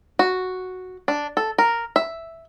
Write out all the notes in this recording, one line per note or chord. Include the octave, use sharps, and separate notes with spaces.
F#4
D4
A4
A#4
E5